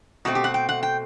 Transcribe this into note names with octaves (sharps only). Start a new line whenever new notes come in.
B2 A3 C4 F#4
G4
F#5
G5
F#5
G5